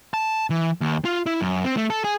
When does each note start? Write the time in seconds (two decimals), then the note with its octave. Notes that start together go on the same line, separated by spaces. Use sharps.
0.14 A5
0.50 E3
0.81 D#2
1.05 F4
1.26 E4
1.41 F#2
1.65 C4
1.77 A3
1.90 A4
2.04 G#4